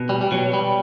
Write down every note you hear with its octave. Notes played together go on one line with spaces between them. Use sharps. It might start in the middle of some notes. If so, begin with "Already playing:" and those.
Already playing: B2
G3
G3
B2 F#3
G3